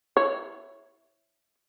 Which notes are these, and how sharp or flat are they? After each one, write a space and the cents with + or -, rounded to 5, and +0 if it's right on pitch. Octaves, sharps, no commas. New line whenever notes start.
E4 +0 C#5 +0